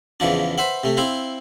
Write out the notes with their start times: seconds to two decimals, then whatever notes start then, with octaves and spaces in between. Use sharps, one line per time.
0.20 E2 C#3 E3 F3 D4
0.58 B4 C5 E5 F#5
0.84 C3 A3
0.97 C4 E4 C5 F5